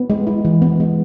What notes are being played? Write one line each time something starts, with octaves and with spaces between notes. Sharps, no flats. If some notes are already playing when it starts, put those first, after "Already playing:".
Already playing: B3
G#3
E4
E3
B3
G#3